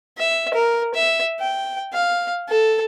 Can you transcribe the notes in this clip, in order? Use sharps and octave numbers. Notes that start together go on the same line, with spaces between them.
E5
A#4
E5
G5
F5
A4